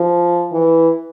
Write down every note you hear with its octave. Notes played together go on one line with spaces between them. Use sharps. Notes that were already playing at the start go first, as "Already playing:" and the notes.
Already playing: F3
E3